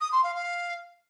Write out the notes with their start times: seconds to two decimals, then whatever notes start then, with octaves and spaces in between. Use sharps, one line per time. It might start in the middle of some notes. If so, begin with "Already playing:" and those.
0.01 D#6
0.12 C6
0.24 F5
0.35 F5